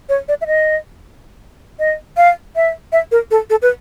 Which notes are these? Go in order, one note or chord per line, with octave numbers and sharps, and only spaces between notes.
C#5
D5
E5
D#5
D#5
F5
E5
E5
A#4
A4
A4
B4